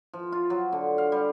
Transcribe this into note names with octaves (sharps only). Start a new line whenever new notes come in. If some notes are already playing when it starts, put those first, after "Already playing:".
F3
F4
F#3
D3
F5
G3